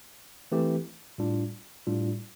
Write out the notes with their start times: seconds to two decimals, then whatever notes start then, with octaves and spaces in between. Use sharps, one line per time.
0.52 E3 A3 C4 G4
1.18 A2 G3 D4 F4
1.87 A2 G3 D4 F4